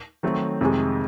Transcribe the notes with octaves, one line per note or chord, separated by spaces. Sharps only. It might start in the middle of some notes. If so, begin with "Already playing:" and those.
D#3 F#3 A3 C4
F2 C3 D#3 G#3